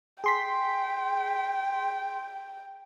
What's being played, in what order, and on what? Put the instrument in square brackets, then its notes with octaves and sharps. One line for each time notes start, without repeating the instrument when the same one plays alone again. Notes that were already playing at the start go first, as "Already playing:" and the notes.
[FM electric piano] G#4 C6 B6 [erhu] G5